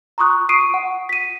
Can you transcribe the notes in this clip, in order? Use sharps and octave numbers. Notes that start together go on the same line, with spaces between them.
A#5 C6 C#6 D#6 F#6
C#6 D#6 C7 D7 D#7
F#5
B6 D#7